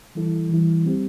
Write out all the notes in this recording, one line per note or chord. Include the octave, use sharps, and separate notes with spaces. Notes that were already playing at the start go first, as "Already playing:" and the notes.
E3 G3 E4 A4
E3 G3 E4
G3 C4 G4